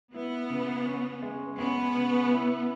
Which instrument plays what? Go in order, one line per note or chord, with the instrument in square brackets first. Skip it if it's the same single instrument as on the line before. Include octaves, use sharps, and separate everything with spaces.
[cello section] B3 [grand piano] E4
[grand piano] C#3
C#4
G#3
[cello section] B3 [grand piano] C#4
[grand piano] C#3
E4